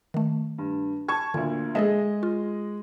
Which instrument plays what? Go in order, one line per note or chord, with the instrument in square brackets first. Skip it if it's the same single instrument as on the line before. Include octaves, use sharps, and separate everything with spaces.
[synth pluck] D#3 A3
[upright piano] G2
A5 C#6 G#6
[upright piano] D2 A#2 [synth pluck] D3
[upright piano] G#3 D#5 [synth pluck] G#4 A4 E5
[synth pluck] F4